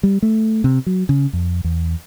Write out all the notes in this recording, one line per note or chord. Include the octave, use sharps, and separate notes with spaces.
G3
A3
C3
F#3
C#3
F2
E2